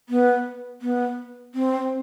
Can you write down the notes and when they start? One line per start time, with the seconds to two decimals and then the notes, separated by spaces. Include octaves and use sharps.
0.09 B3
0.82 B3
1.55 C4